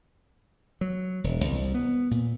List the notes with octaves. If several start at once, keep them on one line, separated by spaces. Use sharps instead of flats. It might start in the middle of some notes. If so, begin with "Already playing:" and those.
F#3
E1
C2
B3
A#2